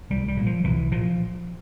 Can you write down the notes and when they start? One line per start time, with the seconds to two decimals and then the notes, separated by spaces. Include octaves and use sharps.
0.10 C2 G3
0.28 G3
0.37 A#2
0.46 F3
0.64 C2 E3
0.91 A#2 F3